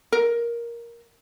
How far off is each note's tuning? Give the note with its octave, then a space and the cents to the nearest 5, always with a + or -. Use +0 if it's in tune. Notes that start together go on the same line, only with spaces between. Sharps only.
A#4 +10